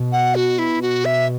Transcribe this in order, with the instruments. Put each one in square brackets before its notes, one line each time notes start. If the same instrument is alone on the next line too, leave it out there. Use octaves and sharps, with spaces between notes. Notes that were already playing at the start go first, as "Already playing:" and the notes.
Already playing: [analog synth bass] B2
[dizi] F#5
F#4
E4
F#4
E5